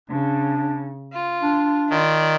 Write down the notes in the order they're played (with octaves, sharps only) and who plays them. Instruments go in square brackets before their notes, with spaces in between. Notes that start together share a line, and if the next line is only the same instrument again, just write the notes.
[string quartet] C#3 [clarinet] D4
[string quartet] F4
[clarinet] D4
[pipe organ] D#3 [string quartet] F4 D5